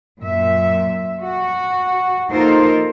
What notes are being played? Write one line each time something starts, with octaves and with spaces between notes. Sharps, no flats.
F#2 A#2 E5
F#4
A#3 D#4 F4 A4 A#4 C5